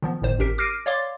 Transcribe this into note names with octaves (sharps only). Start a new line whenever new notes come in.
D#3 F3 B3
G1 A2 D#3 C5
G#1 C#4 G4 A#4 B6
D6 F6 A#6 C7 D7 D#7
C#5 D5 F5 C6 D6 A6